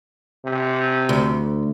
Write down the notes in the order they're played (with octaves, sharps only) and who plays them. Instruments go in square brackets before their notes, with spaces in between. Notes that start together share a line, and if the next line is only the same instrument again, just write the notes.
[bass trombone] C3
[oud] D2